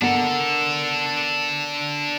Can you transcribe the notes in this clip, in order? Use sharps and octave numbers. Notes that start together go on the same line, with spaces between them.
B3 D4 A4 A#4